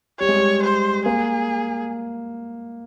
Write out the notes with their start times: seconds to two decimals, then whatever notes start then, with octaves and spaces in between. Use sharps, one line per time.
0.20 G3 C#5
0.29 G#3
0.36 G3
0.63 C5
1.06 A#3 G#4